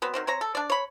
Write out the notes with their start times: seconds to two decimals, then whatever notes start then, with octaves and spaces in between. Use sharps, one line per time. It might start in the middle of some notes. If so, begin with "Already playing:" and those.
0.02 F#3 B3 C4
0.14 D#3 F#3 C4
0.27 C4 C#5 A#5
0.41 A4
0.55 D4 D5
0.70 C#5 B5